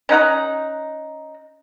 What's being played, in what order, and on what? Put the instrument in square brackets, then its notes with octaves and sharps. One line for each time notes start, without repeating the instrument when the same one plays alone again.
[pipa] C#4 D#4 F#5 A#5